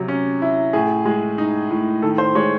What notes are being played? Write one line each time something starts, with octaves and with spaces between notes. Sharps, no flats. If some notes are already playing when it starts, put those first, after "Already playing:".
Already playing: C3 F#3
C#4
E4
A2 G#4
G#3
D#4
A2
D#3 A4
C5
G#3 C#5